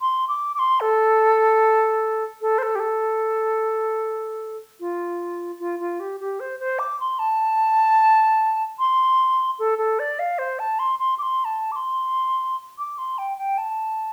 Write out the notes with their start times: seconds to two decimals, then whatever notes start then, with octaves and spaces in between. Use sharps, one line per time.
0.01 C6
0.28 D6
0.55 D6
0.59 C6
0.81 A4
2.41 A4
2.58 C5
2.63 A4
2.75 G4
2.80 A4
4.80 F4
5.60 F4
5.80 F4
6.00 G4
6.20 G4
6.40 C5
6.60 C5
6.79 D6
7.00 C6
7.19 A5
8.79 C6
9.59 A4
9.78 A4
9.99 D5
10.19 F5
10.39 C5
10.59 A5
10.79 C6
10.99 C6
11.18 D6
11.23 C6
11.45 A5
11.72 D6
11.76 C6
12.78 D6
12.98 C6
13.18 G5
13.38 G5
13.58 A5